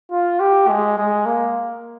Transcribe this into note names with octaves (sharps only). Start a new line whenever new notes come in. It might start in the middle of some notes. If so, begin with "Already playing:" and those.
F4
G4
G#3
G#3
A#3